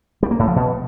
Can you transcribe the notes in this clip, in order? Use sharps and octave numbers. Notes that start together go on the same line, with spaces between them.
G3
A#3
A2
F3
B2